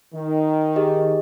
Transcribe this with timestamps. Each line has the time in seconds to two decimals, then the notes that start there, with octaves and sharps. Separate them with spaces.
0.14 D#3
0.76 G4 G#4 D#5